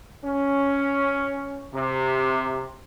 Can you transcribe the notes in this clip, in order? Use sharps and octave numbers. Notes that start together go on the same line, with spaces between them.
C#4
C3